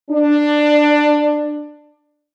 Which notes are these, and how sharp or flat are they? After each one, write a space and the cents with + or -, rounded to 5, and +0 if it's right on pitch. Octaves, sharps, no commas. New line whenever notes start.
D4 +15